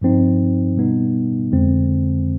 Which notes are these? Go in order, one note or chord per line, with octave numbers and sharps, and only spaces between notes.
G2 F3 C4 D#4
B2 G3 B3 D#4
F2 D3 G#3 C4